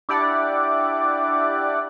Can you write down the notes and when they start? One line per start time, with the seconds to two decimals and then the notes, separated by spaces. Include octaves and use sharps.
0.09 D4 E4 G4 D5 F#5